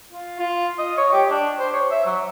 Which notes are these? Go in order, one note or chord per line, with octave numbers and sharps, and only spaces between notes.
F4
F4
D#5
C#5
G4
D4
C5
C#5
E5
F#3